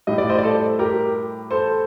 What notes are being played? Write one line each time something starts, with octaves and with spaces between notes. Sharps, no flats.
A2 G3 D#5
D5
C5 D#5
D5
A4 C5
G4 A#4
A4 C5